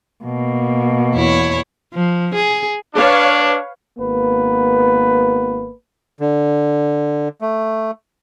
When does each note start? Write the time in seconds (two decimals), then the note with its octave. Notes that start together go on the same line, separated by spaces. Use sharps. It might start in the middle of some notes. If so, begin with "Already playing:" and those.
0.24 B2 A#3
1.12 E2 E4 C#5
1.94 F3
2.34 G#4
2.94 D4 B4 C#5 F5
3.98 G#1 A#3 B3 B4
6.20 D3
7.41 A3